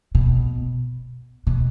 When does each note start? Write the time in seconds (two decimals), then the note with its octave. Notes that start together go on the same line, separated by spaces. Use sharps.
0.15 B2
1.47 B2